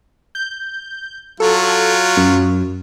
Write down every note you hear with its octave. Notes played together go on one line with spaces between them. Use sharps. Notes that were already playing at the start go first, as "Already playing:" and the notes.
G6
F#3 F4 A4
F#2